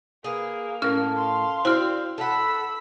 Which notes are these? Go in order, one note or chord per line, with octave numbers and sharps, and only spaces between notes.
A#3 G#4 B4
A2 C#4 A#4 F6
F5 C6
C4 E4 F#4 C5 D5 F6
A4 F#5 B5 E6